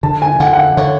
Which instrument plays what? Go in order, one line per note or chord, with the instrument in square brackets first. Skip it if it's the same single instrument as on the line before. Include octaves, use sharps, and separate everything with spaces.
[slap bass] D3 [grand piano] A5
[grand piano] G#5
[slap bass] D3 [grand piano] F#5
[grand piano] F#5
F5
[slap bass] D3 [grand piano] C#5